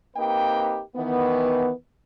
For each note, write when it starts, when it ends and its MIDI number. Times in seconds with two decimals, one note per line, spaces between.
0.16 0.79 58
0.16 0.79 60
0.16 0.79 63
0.16 0.79 67
0.16 0.79 71
0.16 0.79 79
0.96 1.70 51
0.96 1.70 52
0.96 1.70 59